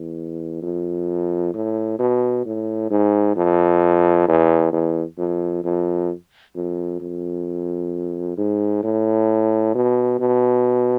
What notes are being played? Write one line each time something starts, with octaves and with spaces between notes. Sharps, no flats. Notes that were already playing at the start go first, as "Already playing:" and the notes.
Already playing: E2
F2
A2
B2
A2
G#2
F2
E2
E2
F2
F2
F2
F2
G#2
A2
B2
B2